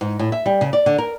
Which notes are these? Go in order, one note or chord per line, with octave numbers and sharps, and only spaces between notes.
G#2
A2
E5
G3
C#3
D5
D3
A#4